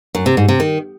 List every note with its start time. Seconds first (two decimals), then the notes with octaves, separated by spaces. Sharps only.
0.15 F#2
0.26 C3
0.37 G#2
0.48 C3
0.60 D#3